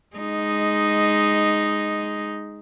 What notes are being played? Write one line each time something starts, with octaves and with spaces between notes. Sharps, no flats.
G#3 D#4